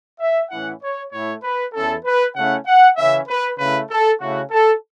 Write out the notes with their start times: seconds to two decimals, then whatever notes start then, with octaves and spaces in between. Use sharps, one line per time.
0.20 E5
0.50 A2 E3 C#4 E4 F#5
0.81 C#5
1.12 A2 A3 E4 C#5
1.43 B4
1.74 E2 E3 C#4 E4 A4
2.05 B4
2.35 C#3 A3 C#4 E4 F#5
2.67 F#5
2.97 C#3 E3 C#4 E5
3.29 B4
3.59 C#3 A3 E4 B4
3.90 A4
4.20 C#3 A3 C#4 E4 F#4
4.51 A4